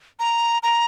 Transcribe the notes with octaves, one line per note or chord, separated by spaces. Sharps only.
A#5
A#5